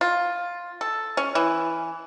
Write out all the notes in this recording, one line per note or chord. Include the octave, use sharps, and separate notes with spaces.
F4
A4
C#4
E3